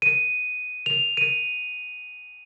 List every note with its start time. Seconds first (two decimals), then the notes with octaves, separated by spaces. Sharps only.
0.02 D#7
0.86 F7
1.17 D#7